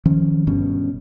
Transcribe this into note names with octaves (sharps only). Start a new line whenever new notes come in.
D#3 F3 C#4
G1 G2 B2 C#4